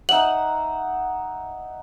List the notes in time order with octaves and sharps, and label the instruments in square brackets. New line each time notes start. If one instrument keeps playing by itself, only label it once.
[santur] D#4 E5 F#5 [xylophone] F#7